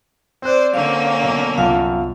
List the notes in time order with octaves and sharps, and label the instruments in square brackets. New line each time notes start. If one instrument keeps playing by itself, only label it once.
[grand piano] C4 F#6 [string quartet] C5 D5
[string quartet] D3 A#3 C#4 [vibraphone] F5
[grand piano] B1
[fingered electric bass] C2 [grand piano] F#2 F#5 A5 [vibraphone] B3 F4 F5